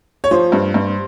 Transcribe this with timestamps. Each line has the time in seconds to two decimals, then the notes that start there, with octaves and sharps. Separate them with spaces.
0.24 C#5
0.31 F3 C5
0.52 G2
0.74 G2